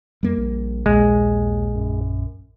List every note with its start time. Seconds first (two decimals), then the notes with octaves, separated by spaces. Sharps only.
0.23 F2 G3 A#3
0.37 A#1
0.86 A#1 D#2 G#3
1.75 F#2